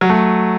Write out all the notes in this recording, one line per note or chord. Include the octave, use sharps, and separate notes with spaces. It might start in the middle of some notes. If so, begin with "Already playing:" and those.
F#3
A3